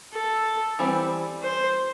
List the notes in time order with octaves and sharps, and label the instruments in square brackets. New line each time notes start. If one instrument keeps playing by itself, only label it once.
[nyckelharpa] A4
[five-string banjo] E3 G3 C4
[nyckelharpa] C5